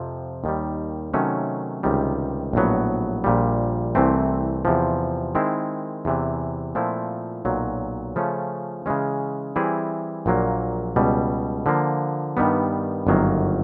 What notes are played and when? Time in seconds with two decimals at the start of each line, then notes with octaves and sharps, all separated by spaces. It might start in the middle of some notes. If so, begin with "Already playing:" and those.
Already playing: F2 C3 F3
0.44 D#2 D#3 G3
1.14 C3 D#3 F#3 A3 C#4
1.83 C#2 C3 D#3 G3
2.53 A#1 A2 F#3 B3
3.24 A#1 A#2 G3
3.95 C2 C3 E3 A3 C4
4.65 E2 C3 F3
5.35 D#3 G#3 C4 E4
6.05 E2 C3 E3
6.75 A#2 F3 A3 C4 E4
7.45 B1 A#2 F#3
8.16 C#3 F3 A3 C#4
8.86 C#3 E3 G#3 C#4
9.56 E3 G3 C4 E4 G#4
10.26 A#1 A#2 F#3 A#3
10.96 C#2 B2 G3
11.66 D3 F3 A#3
12.37 G2 D#3 G3 B3
13.07 G1 F#2 D#3 F#3 A#3